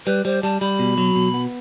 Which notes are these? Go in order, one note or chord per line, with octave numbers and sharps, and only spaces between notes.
G3 B4
G3 C5
G3 A5
G3 B5
B2
F#3
B2
B3